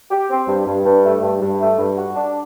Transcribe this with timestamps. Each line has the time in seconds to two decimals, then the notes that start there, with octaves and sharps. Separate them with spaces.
0.11 G4
0.30 C4
0.48 G2
0.67 G2
0.86 G2
1.04 A3
1.23 G2
1.42 G2
1.61 A3
1.79 G2
1.97 F#4
2.16 D4